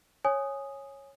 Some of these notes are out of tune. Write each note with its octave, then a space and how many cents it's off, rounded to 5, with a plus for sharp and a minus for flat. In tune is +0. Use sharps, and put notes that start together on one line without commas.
C#5 -10 G#5 +0 D#6 -5